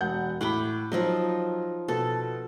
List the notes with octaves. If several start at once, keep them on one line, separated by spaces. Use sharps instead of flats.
E1 F#5 G6
A2 F#5 G5 B5 D6
F3 F#3 D#4 A#4
B2 A4